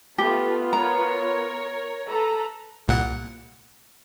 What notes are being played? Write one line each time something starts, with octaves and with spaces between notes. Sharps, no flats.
A3 B3 F4 G4
A#4 C#5 A#5
A4 B4 A#5
C2 A#2 F#5